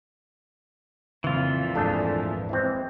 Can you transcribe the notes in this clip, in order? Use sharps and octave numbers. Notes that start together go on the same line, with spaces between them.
F2 A#2 C#3 E3 C4 F4
D#1 G#2 A3 D4 G#4
E3 G#3 C4